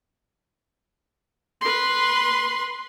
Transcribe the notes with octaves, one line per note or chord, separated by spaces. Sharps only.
B4 C6